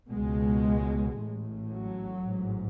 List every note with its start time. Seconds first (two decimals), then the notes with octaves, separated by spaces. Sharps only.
0.10 C#2 B2 G#3
1.19 A1 A2
1.73 F#3
2.28 A1 G#2